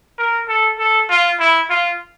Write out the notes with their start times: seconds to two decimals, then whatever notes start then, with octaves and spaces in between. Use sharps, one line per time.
0.18 A#4
0.48 A4
0.79 A4
1.10 F4
1.40 E4
1.70 F4